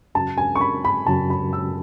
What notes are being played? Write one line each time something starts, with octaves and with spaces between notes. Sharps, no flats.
F#2 C#3 F#3 C#4 F#4 A5
G#5
C#6
B5
B5
F#2 C#3 F#3 C#4 F#4 A5
B5
E6